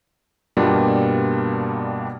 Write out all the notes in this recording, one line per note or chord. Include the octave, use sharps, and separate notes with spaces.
G2 B2 G3 A#3 D4 F4